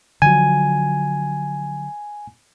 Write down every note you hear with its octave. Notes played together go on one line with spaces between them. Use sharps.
D3 F3 F#3 G#5